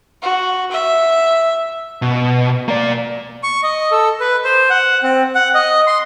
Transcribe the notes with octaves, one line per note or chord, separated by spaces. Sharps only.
F#4
E5
B2
A#3 D5
C#6
D#5
A4
B4
C5
F#5
C4
F#5
D#5
C6